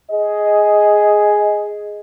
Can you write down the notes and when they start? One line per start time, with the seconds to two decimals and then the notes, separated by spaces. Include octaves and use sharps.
0.11 G#4 D#5